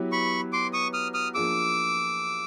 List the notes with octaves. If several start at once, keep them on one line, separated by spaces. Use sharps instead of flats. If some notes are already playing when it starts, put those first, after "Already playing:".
Already playing: F#3 B3 E4 G4 B4
B5 C#6
C6 D6
C#6 D#6
D#6 F6
D#6 F6
F3 A#3 D4 F4 G#4 D6 E6